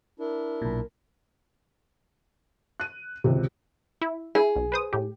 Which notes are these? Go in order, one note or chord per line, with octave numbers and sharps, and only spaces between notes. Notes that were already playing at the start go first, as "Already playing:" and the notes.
D4 E4 A#4
B1 A#2
F#6 D#7
G#1 C#2 C3
E4
E4 G#4
B1
B4 C5 D#6
A2 G4